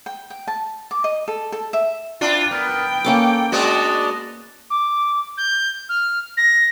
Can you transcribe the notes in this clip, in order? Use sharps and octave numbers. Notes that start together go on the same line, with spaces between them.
G5
G5
A5
D6
D#5
A4
A4
E5
C4 D4 E4 F4
B3 A#4 B4 G5
A#3 C#4 A4 D6
G#3 B3 D4 F#4 D5 D#5
D6
G6
F6
A#6